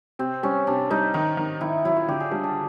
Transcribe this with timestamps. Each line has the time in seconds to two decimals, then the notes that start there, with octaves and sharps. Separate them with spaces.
0.19 C3 C4
0.43 G3 C#4
0.67 C3 D4
0.90 G3 D#4
1.14 D#3 D#4
1.37 D#3
1.61 D#3 E4
1.85 F#3 E4
1.96 F4
2.08 D3 G4
2.20 G#4
2.31 G3 D4
2.44 D4